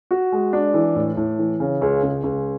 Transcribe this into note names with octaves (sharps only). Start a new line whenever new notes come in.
F#4
G#3
D4
E3
A2
A2
E3
C#3
C#2
C#2
C#2